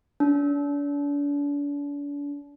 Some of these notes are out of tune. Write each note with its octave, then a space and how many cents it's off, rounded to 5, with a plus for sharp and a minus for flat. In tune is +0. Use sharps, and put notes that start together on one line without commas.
D4 -40